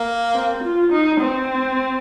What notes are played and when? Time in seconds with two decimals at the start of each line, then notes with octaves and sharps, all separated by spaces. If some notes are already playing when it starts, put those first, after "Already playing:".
Already playing: A#3
0.35 C4
0.64 F4
0.92 D#4
1.21 C4